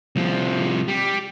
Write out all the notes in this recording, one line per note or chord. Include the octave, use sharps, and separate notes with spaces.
C2 F3
G3